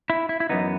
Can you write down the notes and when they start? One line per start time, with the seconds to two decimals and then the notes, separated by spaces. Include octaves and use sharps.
0.10 E4
0.29 E4
0.40 E4
0.49 F#2 C#3 E3 B3 D#4